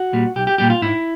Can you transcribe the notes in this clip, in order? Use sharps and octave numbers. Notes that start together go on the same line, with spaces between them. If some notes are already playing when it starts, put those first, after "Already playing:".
Already playing: F#4
A#2 G3
B1 G4
G4
A#2 G3 G4
F4
G#2 E4